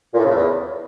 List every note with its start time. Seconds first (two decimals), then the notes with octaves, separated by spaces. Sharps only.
0.14 A#2
0.19 A2
0.24 C#3
0.30 A2
0.35 E2